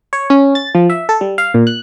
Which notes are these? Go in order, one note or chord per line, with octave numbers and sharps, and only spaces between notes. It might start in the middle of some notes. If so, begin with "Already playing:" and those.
C#5
C#4
A6
F3
E5
A4
G3
F5
A#2
F#6